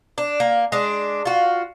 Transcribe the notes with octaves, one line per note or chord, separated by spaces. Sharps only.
D4
A#3
G#3 D4
F4 F#4